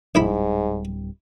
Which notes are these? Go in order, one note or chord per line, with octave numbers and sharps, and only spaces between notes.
D1 A#1 G#2 G3 E4 B5